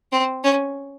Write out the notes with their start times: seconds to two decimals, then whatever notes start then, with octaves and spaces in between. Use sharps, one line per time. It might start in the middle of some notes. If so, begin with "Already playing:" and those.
0.12 C4
0.44 C#4